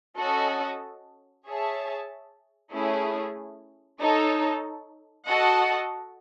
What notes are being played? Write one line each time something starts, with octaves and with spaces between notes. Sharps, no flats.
C#4 F#4 A4 D#5
G#4 C#5 E5 A5
A3 C#4 E4 G#4
D#4 A4 C#5
F#4 A4 D#5 F#5 A5